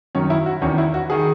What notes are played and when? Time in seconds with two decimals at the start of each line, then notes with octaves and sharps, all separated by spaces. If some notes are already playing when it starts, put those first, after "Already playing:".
0.15 F#2 D#3 C#4
0.30 E4
0.46 F#4
0.61 E2 D#3 C#4
0.78 E4
0.94 F#4
1.10 D#3 G#4